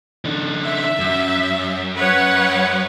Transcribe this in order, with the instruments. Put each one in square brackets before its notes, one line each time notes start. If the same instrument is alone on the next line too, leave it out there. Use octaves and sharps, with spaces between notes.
[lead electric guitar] D#3 D4
[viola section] E5
[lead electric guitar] F#2
[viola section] B4 C#5 F#5